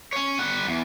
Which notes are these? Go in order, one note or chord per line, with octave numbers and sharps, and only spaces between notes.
C#4 C#5
G3 F#5
E2